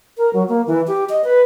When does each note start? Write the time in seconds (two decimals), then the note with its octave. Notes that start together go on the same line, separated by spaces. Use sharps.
0.18 A#4
0.33 F#3
0.49 A#3
0.67 E3
0.87 G4
1.09 D#5
1.24 B4